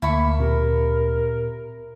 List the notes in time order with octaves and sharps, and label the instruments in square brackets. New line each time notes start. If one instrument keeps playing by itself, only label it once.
[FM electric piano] D2 [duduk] A#3 [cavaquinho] E4 B5 C#6
[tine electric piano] A#2 C4 G4 [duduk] A#4